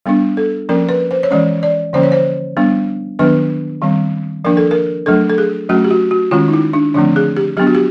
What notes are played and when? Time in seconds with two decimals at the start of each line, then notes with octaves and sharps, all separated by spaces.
0.06 G3 B3 D4
0.37 A4
0.69 F3 A#3 C#4 A#4
0.89 B4
1.11 C5
1.23 C#5
1.31 E3 G#3 C#4 D5
1.63 D5
1.93 D3 F3 A#3 C#4 C5
2.03 C#5
2.12 C5
2.57 G3 B3 D4
3.19 D#3 F#3 B3 D4 B4
3.82 D#3 G3 C4
4.45 F3 A#3 D4 A#4
4.57 A4
4.71 A#4
5.06 F#3 A3 D4 A4
5.29 A4
5.38 G#4
5.69 F#3 A3 C#4 F#4
5.84 G4
5.91 F#4
6.11 F#4
6.31 D#3 G#3 C#4 F4
6.48 D#4
6.53 E4
6.73 D4
6.94 D3 F3 A3 C4 D4
7.16 G#4
7.37 G4
7.57 F#3 B3 D4 G4
7.67 F#4
7.75 G4